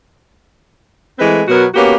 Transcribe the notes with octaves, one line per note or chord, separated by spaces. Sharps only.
E3 G#3 A3 C4 B4
B2 F#3 B3 F#4 A#4
A#3 B3 C#4 F#4 G4